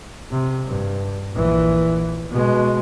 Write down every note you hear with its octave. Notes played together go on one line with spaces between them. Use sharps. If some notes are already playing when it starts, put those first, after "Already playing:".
C3
G2
A#1 E3
B2 G#3